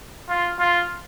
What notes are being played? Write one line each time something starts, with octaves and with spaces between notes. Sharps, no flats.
F4
F4